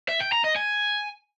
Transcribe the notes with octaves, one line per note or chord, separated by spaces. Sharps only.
E5
G5
A#5
D#5
G#5